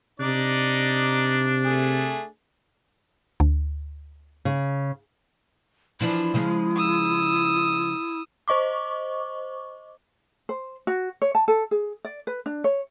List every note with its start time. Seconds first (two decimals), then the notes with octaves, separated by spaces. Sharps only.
0.20 C3 D4 D#4 D5
1.64 A3 G#4
3.40 D2
4.45 C#3
6.01 E3 F3 D4 E4
6.34 C#3 F3 G#3
6.76 D#6 E6
8.48 C5 D#5 C#6 D6
10.49 C5
10.87 F#4
11.22 C#5
11.35 A5
11.48 A4
11.71 G#4
12.05 D5
12.27 B4
12.46 D4
12.64 C#5